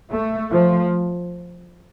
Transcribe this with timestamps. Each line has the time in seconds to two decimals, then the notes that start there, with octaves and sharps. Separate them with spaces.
0.12 A3
0.51 F3